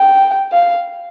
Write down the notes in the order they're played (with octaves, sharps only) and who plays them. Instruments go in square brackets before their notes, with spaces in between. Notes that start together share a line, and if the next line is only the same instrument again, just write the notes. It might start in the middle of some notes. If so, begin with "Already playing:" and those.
Already playing: [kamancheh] G5
F5